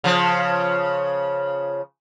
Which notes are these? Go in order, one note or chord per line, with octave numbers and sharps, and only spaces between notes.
C#3 F3